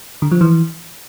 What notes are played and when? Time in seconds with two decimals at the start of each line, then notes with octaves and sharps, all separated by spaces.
0.22 D3
0.31 F3
0.41 E3